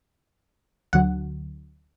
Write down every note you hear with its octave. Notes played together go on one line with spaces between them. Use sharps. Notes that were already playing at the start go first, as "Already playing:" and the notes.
D2 D3 F#3 F#5